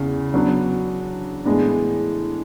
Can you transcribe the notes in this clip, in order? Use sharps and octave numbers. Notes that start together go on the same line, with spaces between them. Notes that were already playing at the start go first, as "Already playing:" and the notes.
Already playing: E2 C#3
F#3 B3 D4
A2 E3 G#3 B3 D4